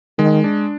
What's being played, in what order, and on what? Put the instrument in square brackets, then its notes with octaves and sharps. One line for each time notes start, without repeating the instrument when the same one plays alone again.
[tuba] D#3 [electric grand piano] G#3
[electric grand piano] D4